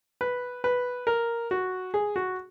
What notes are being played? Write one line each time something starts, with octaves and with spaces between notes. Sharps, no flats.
B4
B4
A#4
F#4
G#4
F#4